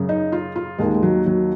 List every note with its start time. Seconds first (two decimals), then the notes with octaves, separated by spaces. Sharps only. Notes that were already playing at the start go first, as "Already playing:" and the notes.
Already playing: F#2 C#3
0.09 D#4
0.32 F4
0.56 F4
0.78 D#2 D#3 G#3
0.94 G#3
1.03 F#3
1.26 F#3